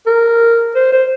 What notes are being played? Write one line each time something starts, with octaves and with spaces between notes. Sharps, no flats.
A#4
C5
C5